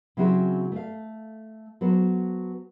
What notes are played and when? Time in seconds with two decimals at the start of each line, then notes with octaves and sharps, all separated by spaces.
0.17 C#3 F#3 C4 E4 F#4 G#4
0.72 A3 F5
1.81 F#3 B3 F#4 A4 C5